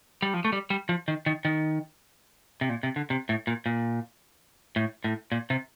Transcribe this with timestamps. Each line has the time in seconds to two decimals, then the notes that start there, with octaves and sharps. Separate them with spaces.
0.22 G3
0.34 F3
0.45 A3
0.52 G3
0.70 G3
0.89 F3
1.08 D#3
1.26 D#3
1.45 D#3
2.61 C3
2.69 A#2
2.83 C3
2.96 D3
3.10 C3
3.29 A2
3.47 A#2
3.66 A#2
4.76 A2
5.04 A2
5.32 A#2
5.50 C3